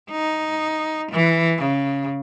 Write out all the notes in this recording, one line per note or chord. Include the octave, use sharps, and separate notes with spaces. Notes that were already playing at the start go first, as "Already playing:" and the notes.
D#4
E3
C#3